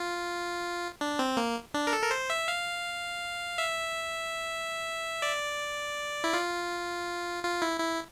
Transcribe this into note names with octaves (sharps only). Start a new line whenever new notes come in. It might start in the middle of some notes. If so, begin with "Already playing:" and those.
Already playing: F4
D4
C4
A#3
D4
A#4
A4
A#4
C5
E5
F5
E5
D5
E4
F4
F4
E4
E4